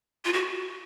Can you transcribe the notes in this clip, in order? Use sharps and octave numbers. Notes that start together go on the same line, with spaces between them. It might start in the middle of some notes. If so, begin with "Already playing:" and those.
F4
F#4